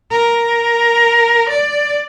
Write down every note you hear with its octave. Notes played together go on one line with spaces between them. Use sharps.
A#4
D5